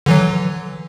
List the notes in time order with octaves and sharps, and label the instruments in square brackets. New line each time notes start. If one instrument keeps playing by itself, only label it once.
[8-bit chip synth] D3 E3 F#3